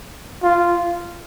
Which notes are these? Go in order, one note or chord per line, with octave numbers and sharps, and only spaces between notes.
F4